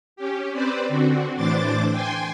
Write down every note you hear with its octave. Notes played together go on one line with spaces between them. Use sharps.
C#4 G4
C4 B4 C5 D5
D3 C4 F#4
A2 E3 D4 C5 D6 A6
G5 G#5 C6